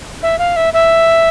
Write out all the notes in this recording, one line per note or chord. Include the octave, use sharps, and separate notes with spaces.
E5
F5
E5
E5